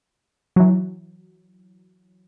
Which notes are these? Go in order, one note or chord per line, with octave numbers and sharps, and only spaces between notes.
E3 F#3